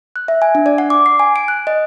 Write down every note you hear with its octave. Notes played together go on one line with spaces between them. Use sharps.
F#6
E5
G#5
D4
D5
F#5
D6
C7
G#5
D7
F#6
D#5